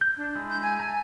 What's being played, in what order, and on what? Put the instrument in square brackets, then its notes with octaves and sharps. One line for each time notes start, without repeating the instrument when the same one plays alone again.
[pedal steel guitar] G6
[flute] D4
[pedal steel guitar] G#3 E4
[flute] G6
G#5
[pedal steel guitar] E5 A5 A#5